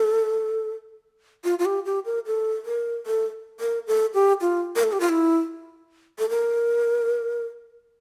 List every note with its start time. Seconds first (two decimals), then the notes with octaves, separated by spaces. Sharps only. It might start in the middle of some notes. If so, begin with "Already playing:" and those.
Already playing: A4
1.44 F4
1.59 F4
1.65 G4
1.85 G4
2.05 A#4
2.26 A4
2.66 A#4
3.07 A4
3.60 A#4
3.87 A4
4.14 G4
4.41 F4
4.76 A#4
4.84 A4
4.92 G4
5.00 F4
5.09 E4
6.19 A4
6.30 A#4